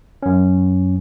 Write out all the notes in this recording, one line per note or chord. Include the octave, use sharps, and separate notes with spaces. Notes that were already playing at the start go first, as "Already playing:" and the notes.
F#2 C#4